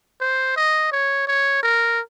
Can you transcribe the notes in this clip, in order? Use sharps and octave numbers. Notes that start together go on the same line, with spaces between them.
C5
D#5
C#5
C#5
A#4